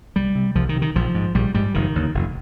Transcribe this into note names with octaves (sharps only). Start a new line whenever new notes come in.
C2 G3
C3
C2 F3
D#3
C3
D#3
A#1 F3
G#2
A#1 G3
G#2 G3
F1 D#3
D#2 D3
F1